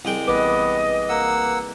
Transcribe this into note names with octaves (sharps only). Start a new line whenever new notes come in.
C2 G#3 G5
A1 B3 B4 D#5 D6
A#3 F#5 E6